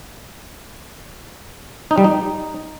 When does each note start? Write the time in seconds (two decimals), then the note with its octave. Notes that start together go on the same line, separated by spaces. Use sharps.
1.91 D#4
1.98 G3
2.04 D#4